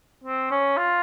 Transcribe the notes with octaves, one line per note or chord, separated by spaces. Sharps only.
C4
C#4
F4